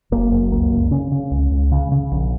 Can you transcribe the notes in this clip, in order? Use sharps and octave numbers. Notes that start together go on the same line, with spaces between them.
F#1 A#3
F#2
C#2 A#3
C#2
C#3 C#4
C#3
C#2
C#2
C#3
C#3
A#1